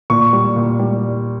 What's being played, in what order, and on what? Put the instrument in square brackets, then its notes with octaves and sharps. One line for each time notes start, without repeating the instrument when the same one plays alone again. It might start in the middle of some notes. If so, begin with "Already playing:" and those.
[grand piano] A#2 C#6
G3
A#2
G3